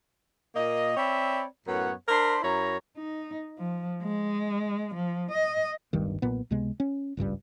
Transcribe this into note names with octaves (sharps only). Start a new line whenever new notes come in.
A#2 A#3 D#5
C4 C#5 D5 E5 B5
F#2 A2 B3 C#5 F#5
D4 A#4 C5 B5 C6
F#2 E4 C#5 A#5
D#4
F3
G#3
F3
D#5
D1 G1 G2 D#3
B1 A#2 B3
C#2 C3 G#3 B3
C#4
G#1 C#2 G2 G3